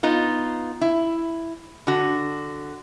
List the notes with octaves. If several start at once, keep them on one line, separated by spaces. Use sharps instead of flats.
B3 D#4 F4
E4
D3 F#4